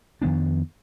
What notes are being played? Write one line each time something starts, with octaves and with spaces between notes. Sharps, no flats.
F2 D#3 B3 D4